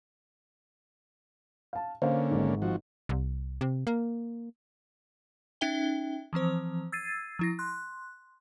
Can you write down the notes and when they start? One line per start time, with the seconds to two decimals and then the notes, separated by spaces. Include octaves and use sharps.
1.73 F5 A5
2.02 D3 A#3 C#4 C5 F5
2.30 G#1 G#2
2.62 F3 F#4
3.09 C2
3.61 C3
3.87 A#3
5.61 C#4 D#4 E5 G5 G7
6.33 E3 F3 C4 C5
6.92 E6 G#6 A6 C7 D#7
7.39 F3 E4 A#6
7.59 C6 F#6